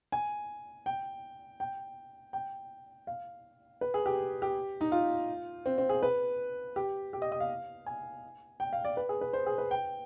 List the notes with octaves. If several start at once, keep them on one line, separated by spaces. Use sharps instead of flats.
G#5
G5
G5
G5
F5
B4
G#4
G4
G4
D#4
F4
C4
C4
G#4
B4
G4
G4
D#5
D#5
F5
G#5
G5
F5
D5
B4
G#4
B4
C5
G#4
B4
G5